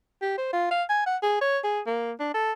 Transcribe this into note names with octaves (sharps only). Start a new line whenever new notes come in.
G4
C5
F4
F5
G#5
F#5
G#4
C#5
G#4
A#3
D4
A4